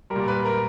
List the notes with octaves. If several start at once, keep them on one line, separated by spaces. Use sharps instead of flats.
G3 A#4
A#2
B4
A#4